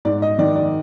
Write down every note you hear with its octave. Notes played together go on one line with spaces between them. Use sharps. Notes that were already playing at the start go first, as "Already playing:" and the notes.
G#2 D5
D#5
D#3 D5
D5